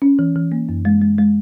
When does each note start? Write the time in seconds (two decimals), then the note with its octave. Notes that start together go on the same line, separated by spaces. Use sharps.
0.02 C#4
0.19 E3
0.36 E3
0.52 A#3
0.69 F#2
0.85 G#3
1.01 G#3
1.18 G#3